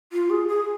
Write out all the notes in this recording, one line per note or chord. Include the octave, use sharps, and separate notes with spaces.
F4
G#4
G#4